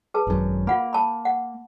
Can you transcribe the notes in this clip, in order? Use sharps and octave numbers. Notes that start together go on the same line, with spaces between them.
G#4 B4 A5
G#1 F#2
A#3 F4 F#5 B5
A5 B5
F#5